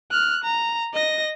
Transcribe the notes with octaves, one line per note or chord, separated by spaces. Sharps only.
F6 F#6
A#5
D#5 A#6